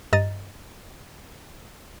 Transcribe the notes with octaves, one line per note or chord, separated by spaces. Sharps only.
G2 D#5 A#5 A6